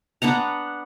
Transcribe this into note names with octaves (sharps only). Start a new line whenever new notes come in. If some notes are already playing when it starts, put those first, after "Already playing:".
B3 D4 F#5 A#5